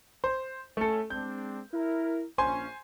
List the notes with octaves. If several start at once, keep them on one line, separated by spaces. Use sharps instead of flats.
C5
A3 C#4 A4
G#3 C4 D4 G6
E4 A#4
A#1 C#4 C5 G#5 C6